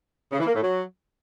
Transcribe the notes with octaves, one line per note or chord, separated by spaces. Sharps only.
C#3
E3
A#3
A2
F#3